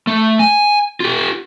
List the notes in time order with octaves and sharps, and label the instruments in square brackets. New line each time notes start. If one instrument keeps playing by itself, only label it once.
[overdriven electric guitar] A3
G#5
F4 G4